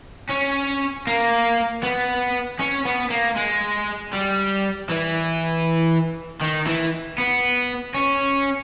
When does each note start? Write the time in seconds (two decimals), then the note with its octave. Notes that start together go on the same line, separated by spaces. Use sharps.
0.30 C#4
1.07 A#3
1.83 B3
2.59 C#4
2.85 B3
3.10 A#3
3.36 G#3
4.13 G3
4.89 E3
6.42 D#3
6.67 E3
7.18 B3
7.95 C#4